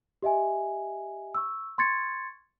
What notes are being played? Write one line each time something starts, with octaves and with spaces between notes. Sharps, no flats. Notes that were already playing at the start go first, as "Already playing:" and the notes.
G4 D#5 E5 G#5
C#6 E6
C6 C#6 G#6 A6 C#7